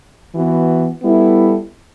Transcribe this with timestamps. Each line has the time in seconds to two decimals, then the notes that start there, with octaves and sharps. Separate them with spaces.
0.33 E3 B3 F#4
1.02 G3 B3 E4 A4